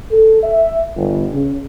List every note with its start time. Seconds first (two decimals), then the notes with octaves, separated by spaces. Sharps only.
0.11 A4
0.43 E5
0.95 G1
1.33 C#3